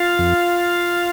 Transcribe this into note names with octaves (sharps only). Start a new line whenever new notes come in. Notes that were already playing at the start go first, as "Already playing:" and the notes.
Already playing: F4 F5
F2